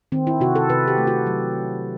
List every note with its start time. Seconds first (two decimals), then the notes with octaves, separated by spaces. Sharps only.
0.12 D#3 C4
0.27 E4
0.40 C3 F#4
0.56 A4
0.69 C3 B4
0.88 G4
0.98 A3
1.07 F#4
1.27 F#3